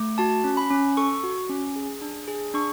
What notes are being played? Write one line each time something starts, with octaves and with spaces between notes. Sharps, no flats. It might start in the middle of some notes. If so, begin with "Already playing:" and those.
Already playing: A3
F#4 A5
C#4
B5
C#4
A4 C#6
F#4
C#4
G#4
D4
G#4
D4 C#6